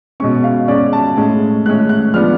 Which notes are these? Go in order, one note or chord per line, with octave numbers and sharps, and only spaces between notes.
B2 G#3 C#4 C#6
F5
B2 G#3 C#4 D5
A5
A2 G#3 C#4
A2 G#3 C#4 F#6
F#6
F3 G#3 B3 D4 F6